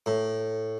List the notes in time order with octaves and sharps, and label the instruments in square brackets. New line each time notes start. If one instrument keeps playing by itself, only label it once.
[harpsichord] A2